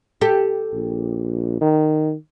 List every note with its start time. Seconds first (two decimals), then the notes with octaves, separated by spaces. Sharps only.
0.21 G4 A4
0.73 A#1
1.61 D#3